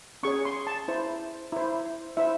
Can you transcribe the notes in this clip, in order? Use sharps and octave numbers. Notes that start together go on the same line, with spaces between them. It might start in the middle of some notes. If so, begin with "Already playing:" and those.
C#4 G#4 C#5 C#6
C6
A5
E4 C5
E4 C5
E4 C5 E5